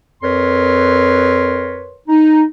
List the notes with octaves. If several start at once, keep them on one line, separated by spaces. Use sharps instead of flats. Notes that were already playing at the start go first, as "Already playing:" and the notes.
F2 A#4 B4 C#5 C6
D#4